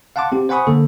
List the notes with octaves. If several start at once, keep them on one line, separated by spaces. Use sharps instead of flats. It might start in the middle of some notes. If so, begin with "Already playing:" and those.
F5 F#5 A5 C6 D6
C4 G4
C5 F#5 G#5 B5 C#6 D#6
D3 A#3 A4